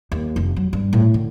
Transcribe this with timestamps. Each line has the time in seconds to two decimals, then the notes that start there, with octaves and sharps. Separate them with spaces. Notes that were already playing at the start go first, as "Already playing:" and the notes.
0.12 D#2
0.36 F1
0.56 F#3
0.73 G2
0.93 A2
1.14 D3